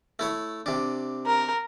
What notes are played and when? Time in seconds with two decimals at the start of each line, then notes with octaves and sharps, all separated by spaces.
0.19 A3 E4 C#5
0.66 C3 D4
1.26 A#4